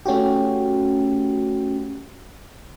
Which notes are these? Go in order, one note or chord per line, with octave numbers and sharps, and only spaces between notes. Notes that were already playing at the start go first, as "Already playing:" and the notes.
A3 C#4 F#4 G4